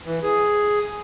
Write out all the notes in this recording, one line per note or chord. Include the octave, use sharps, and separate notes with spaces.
E3
G#4